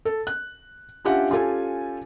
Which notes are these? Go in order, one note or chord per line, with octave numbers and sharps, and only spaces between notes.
A4
F#6
C#4 D4 F4 G4 E5 F#5
C#4 F4 G4 A4 G#5